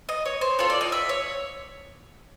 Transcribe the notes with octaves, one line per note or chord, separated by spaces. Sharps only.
D#5
C#5
C5
C4 F4 A4 C#5
D5
D#5
E5
C#5